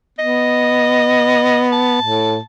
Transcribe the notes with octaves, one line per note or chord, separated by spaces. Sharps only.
B3 D#5
A5
A2